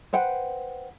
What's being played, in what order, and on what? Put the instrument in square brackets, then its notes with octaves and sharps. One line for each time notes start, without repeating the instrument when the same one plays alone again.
[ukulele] B4 C5 F#5 G5